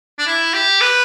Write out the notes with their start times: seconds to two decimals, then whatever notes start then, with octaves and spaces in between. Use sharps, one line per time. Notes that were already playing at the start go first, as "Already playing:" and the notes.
0.18 D4
0.27 E4
0.54 G4
0.81 B4